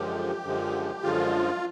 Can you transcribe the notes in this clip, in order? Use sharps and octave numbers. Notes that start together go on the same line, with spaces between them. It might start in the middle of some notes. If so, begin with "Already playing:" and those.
Already playing: F#2 D3 F3 G#3 G4
F#2 D3 F3 G#3
F#2 D3 F3 G#3 F4